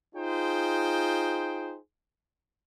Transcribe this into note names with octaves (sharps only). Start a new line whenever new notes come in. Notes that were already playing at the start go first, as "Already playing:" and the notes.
D#4 F4 G#4 C5 G5